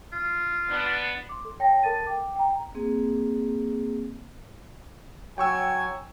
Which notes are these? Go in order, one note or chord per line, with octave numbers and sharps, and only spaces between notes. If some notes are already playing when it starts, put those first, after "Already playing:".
F4
B3 D4
C6 D6
A4
C#5 G5 A5 A#6
A4 A#4 A5 A6 D#7
G5 D6
G5 A#5
A#3 C4 G#4
F#3 G5 G#5 C#6 E6